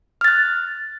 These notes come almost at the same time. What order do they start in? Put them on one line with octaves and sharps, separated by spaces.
F6 A6 F#6